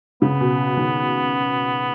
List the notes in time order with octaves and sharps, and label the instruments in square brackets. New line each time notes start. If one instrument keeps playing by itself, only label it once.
[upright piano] C#3 [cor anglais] B3
[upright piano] B2
B2 D#3